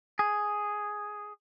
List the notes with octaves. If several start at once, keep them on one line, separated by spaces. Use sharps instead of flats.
G#4